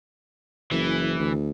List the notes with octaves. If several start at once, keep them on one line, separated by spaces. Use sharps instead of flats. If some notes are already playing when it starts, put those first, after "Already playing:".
F#1 E3
D2